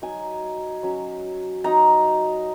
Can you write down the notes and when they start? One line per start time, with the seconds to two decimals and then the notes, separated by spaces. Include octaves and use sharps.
0.02 F#3 D#4 G#5
0.83 F#3 C#4
1.64 F#3 D#4 A#5